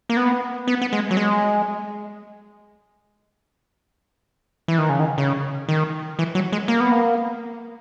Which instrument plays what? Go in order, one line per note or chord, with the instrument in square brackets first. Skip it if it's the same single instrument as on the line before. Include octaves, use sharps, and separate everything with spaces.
[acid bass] A#3
B3
B3
B3
G#3
F#3
G#3
E3
D#3
C#3
D#3
C#3
D#3
E3
F#3
G#3
A#3
B3
A#3